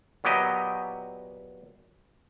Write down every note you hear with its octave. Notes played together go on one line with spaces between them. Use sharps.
A#2 F#3 B3 G4 D#5